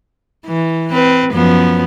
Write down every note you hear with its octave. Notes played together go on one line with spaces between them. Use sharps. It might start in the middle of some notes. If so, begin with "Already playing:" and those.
E3
C4 B4
F#2 F3 B3